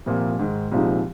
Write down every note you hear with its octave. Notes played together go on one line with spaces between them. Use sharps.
C2 A#2 F3 A#3
G#2 D#3 G#3
C2 A#2 F3 G#3 D#4